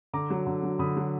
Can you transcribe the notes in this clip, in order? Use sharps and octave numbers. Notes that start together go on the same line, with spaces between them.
D3 A#5 D6
F#3
D3
F#3
D3 B5 D#6
F#3